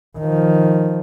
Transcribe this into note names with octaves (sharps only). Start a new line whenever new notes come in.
D#3 F3